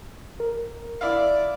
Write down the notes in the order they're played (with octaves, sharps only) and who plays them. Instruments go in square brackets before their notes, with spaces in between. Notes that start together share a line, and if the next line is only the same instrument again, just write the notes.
[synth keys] A#4
[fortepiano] E4 F5 [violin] D5